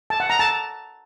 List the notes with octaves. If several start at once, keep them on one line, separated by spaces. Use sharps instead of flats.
A5
F#5
A#5
A5